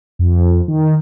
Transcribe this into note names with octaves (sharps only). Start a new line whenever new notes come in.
F2
D#3